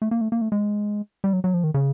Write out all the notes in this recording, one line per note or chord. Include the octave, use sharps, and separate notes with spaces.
A3
A#3
A3
A#3
A3
G#3
G3
F#3
F#3
F3
D#3
C#3